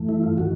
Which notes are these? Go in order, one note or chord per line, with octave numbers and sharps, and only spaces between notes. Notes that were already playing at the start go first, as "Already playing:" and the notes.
Already playing: G2 E3 A3
E4
F4
D#3 F#4